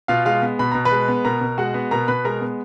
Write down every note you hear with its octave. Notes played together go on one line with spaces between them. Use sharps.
B2 F4 F5
G#3 F4 F5
B3
B2 B5
B2 A#5
B4 B5
G#3
B3
B2 A#4 A#5
B2
G#3 F#4 F#5
B3
B2 A#4 A#5
B2 B4 B5
G#3 A#4 A#5
B3